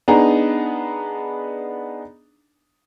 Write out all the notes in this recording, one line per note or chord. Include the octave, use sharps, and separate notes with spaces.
B3 D4 D#4 G#4 A#5